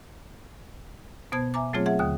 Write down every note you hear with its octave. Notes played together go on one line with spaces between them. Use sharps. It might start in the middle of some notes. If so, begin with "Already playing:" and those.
B2 B3 C5 A5 G#6
E5 G#5 A#5 D6
F#3 A3 C4 F4 G#4 C#5
G#4 E5 F#5
D#2 D3 D#6